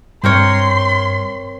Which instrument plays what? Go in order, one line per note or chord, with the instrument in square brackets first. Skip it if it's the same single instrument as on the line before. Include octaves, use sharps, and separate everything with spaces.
[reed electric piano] G2 [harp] C4 A#4 C#5 [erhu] C6